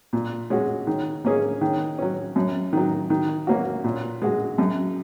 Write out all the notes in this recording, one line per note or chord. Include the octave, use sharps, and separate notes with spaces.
A#2
G#3 C#4 F#4
D#3
A#3 C#4 G#4
D#3
F#3 C#4
F#2
D#3 F#3
D#3
A#3 C#4 F#4
A#2
G#3 F#4
F#2